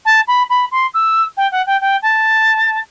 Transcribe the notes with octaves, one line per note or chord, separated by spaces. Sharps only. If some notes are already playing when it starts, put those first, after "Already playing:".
A5
B5
B5
C6
E6
G5
F#5
G5
G5
A5